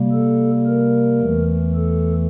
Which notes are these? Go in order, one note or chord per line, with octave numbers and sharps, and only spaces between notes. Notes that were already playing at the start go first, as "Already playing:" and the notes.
Already playing: C3 G3 A#3
A4
A#4
E2 E3 A3
A4